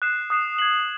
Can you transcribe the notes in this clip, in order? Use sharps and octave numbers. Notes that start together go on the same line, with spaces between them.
D#6 F#6 C7 E7
D#6 F#6 C7 E7
G#6 C7 F#7